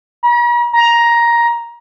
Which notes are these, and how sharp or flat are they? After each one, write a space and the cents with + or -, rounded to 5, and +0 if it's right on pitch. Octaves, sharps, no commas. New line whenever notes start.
A#5 +45
A#5 +10